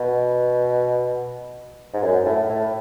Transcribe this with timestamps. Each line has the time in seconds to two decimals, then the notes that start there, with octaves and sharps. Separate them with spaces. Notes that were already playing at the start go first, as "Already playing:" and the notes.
Already playing: B2
1.94 G#2
2.03 F#2
2.25 A2
2.49 A2